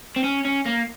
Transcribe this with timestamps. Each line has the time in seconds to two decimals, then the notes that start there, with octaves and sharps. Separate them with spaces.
0.16 C4
0.24 C#4
0.45 C#4
0.66 A#3